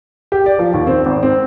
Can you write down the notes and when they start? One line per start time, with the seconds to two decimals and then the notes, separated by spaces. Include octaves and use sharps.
0.32 G4
0.46 D5
0.59 F3
0.74 D#2
0.87 C4
1.06 G#1
1.23 C4